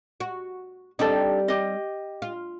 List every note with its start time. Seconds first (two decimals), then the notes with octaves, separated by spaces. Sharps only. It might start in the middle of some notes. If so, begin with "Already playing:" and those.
0.20 F#4
0.99 G3 C4 D4 D#4 A4
1.48 G4 D#5
2.22 F4